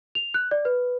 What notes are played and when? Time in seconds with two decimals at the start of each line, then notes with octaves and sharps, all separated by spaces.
0.15 F7
0.34 F#6
0.51 D5
0.65 B4